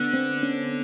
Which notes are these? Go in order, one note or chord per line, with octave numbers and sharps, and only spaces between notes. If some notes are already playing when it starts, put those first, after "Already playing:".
Already playing: D3 B3
C4
C#4